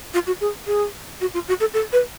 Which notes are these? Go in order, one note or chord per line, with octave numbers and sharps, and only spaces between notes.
F4
F#4
G#4
G#4
F#4
F4
F#4
A4
A4
B4